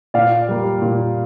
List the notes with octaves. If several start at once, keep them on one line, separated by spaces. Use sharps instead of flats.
A#2 D5 F5
G3 A#3
A#2